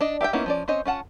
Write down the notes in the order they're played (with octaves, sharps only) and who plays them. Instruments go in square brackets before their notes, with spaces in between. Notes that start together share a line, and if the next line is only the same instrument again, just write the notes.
[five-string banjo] D4 D#5
G4 E5 F5 G5
A#3 B3 C#4 D#4 E4
F3 C#4 D5
C4 C#4 C5 C#5 D#5
C#4 F4 F#5 A5